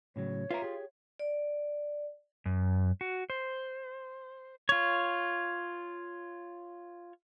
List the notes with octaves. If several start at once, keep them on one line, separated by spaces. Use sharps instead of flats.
A2 C#3 F#3 C#5
F4 B4 E5 A#5
G4 G#4
D5
F#2
F#4
C5
F4 C#5